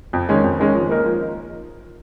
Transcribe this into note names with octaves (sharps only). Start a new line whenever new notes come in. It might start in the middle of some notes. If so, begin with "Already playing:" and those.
F2
D#3 G#3 C#4
F2
D#3 G#3 C#4
F3
A#3 D#4 A#4
F3